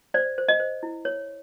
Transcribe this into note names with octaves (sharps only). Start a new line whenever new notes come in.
C5 D5
C5
D#5
C5
E4
C#5